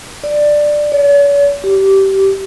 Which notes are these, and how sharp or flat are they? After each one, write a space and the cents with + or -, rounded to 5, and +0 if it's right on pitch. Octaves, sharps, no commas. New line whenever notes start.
D5 +10
C#5 +45
G4 -20